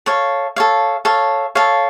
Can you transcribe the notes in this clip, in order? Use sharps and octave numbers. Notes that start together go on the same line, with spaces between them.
A4 C#5 F5
A4 C#5 F5
A4 C#5 F5
A4 C#5 F5